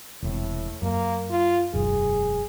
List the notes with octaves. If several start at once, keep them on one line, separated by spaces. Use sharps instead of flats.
E1 A2 C3
F#2 A#3
F4
E1 B1 F#2 G#4